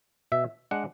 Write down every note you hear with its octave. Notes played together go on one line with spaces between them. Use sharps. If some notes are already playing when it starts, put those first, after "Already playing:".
B2 E5
G#3 D4 F#5